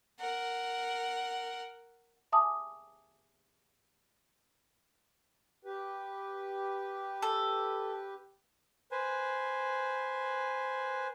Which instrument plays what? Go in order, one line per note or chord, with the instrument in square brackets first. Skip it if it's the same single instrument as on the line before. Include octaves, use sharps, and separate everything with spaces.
[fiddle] A#4 F#5
[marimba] E5 G#5 A5 D6 D#6
[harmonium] G4 B4
[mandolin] A4
[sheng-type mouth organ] B4 C5 G#5